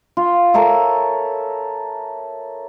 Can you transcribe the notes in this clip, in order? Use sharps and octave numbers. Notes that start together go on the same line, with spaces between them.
F4
A4 A#4 C#5 E5